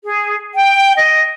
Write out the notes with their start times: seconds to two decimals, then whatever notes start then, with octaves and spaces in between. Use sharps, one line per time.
0.05 G#4
0.55 G5
0.98 D#5